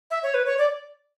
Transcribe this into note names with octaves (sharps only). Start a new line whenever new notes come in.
E5
C#5
B4
C#5
D5